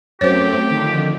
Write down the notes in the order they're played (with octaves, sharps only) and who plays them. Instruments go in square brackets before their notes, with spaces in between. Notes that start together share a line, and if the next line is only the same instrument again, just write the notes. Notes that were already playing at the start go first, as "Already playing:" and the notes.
[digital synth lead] F#2 [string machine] F#3 A3 C4 [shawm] G4 [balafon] C5 C#5
[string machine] D3 F3 [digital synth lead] D#3